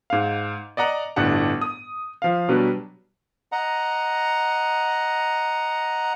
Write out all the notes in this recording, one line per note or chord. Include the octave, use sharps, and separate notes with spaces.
G#2 F5
D5 D#5 F#5 A#5
G1 A2 D4 G4 F#5 A5
D#6
F3 F5
B2 F#3 G3 D4 B4
D#5 F#5 A#5